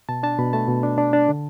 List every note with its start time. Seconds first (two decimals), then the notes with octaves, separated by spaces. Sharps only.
0.09 B2 A5
0.23 D4 A5
0.39 B2 B5
0.53 A3 A5
0.68 B2
0.83 D4
0.98 D4
1.13 D4
1.28 D3